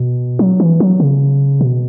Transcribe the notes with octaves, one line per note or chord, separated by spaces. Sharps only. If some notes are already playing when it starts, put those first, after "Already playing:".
Already playing: B2
F#3
E3
F#3
C#3
B2